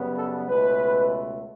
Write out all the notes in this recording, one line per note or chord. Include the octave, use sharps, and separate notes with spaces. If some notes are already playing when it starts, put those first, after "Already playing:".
Already playing: F#2 C#3 G3 B3
A4
C#2 B2 A3 B4